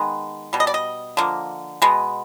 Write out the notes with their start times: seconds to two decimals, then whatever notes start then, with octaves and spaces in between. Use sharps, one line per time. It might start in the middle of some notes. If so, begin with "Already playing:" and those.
Already playing: D#3 G#3 B3
0.53 B2 G3
0.60 D#5
0.67 D5
0.74 D#5
1.17 D3 F3 A#3
1.82 B2 G#3 B3